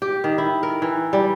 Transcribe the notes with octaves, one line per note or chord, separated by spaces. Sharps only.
G4
D#3
E4
A#4
E3
G3